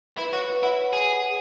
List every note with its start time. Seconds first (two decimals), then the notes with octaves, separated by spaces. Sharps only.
0.18 E4 B4
0.33 F#4 C#5
0.49 B4
0.63 E4 F#5
0.93 G#4